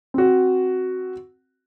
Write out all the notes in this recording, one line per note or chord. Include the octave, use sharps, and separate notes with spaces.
C4 F#4